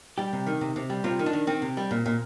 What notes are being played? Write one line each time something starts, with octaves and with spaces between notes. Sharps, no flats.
G3 G4
C3
D#3
C3
C3
G3
C3 F4
D#3
D4
D#3
D#3 C4
C3
G3
A#2
A#2